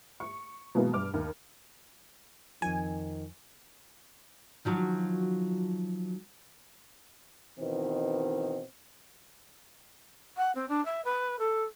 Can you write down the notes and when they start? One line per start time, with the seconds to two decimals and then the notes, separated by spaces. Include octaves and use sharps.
0.20 C#6
0.75 B2 E3 F#3 G#3 A#3 B3
0.93 G2 D6 F6
1.14 D#2
2.62 F2 D#3 F3 G#5
4.65 D#3 F3 F#3
7.59 B2 D#3 E3 C4
10.36 F#5
10.55 C4
10.68 D4
10.85 E5
11.04 B4
11.38 A4